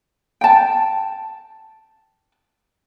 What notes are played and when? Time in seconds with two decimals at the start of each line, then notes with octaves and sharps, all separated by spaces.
0.41 G5 A5